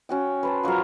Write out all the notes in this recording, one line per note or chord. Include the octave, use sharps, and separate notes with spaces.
C#4 F#4 G5
B4 C5 A5
F3 F#3 F4 A#4